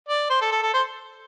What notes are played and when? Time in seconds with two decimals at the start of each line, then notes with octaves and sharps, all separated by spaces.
0.09 D5
0.30 C5
0.41 A4
0.52 A4
0.62 A4
0.74 C5